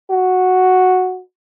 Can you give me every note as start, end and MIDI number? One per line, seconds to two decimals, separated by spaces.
0.10 1.21 66